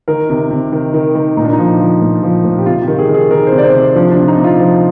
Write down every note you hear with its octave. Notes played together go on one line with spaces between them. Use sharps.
D#3 A#4
C3
C3
D#3
D#3
D#3
A#2 D#4
D4
D#4
F3
F3
A#2
F3
A#2
G4
C3 F4
G4
D#3
G#4
D#3
G#4
D#3 A#4
C5
C3
D5
C5
C3
F3 D4
D4
C3
D#4
C3
F4
F3